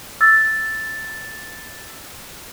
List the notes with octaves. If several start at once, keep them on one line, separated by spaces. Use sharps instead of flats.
E6 A6